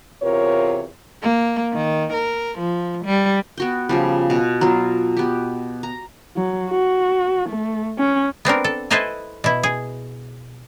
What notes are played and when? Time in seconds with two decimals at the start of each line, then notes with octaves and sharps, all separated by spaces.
0.22 E2 C3 F4 A#4 C#5
1.22 A#3
1.72 D#3
2.13 A#4
2.58 F3
3.05 G3
3.58 B3 F#4 G5
3.89 C#3 F3 G3
4.30 B2 F#4
4.61 F#3 B3 F4
5.17 B3 G4
5.83 A#5
6.36 F#3
6.70 F#4
7.50 A3
7.99 C#4
8.45 B3 C4 D4 A#4
8.64 A4
8.90 E4 A4 B4 C5 D#5 G#5
9.44 B2 E4
9.63 G#4